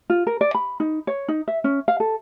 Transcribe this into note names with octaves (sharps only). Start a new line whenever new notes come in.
F4
A#4
D5
B5
D#4
C#5
D#4
E5
C#4
F5
A4